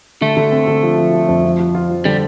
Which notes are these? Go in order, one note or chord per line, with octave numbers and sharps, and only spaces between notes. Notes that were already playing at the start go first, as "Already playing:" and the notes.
D3 A3
D3
C4
D3
F3
F3
F3
F2
F3
F3
F4
F3
D3 G3